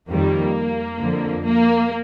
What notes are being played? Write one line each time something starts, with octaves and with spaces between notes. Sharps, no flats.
F2 D#3 G3 A#3
F2 D3 F3
A#3